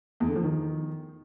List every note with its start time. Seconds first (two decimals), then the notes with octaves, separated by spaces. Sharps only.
0.20 E2
0.28 D3
0.36 F3
0.43 D#3